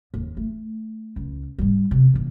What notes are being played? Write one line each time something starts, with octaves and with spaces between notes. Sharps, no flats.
D#2
A3
C#2
G#2 G3
C3
A#2 E3